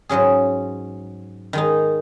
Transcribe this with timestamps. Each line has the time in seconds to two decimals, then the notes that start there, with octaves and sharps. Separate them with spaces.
0.09 G#2 F#3 C#4 G#4
1.53 D#3 G#3 D#4